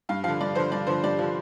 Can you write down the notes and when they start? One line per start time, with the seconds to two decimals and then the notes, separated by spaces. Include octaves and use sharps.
0.09 G2 F5
0.24 D3 F3 F5
0.40 G2 D5
0.55 D3 F3 C5
0.71 G2 D5
0.87 D3 F3 C5
1.03 G2 D5
1.19 D3 F3